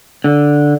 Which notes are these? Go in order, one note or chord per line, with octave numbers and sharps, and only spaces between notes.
D3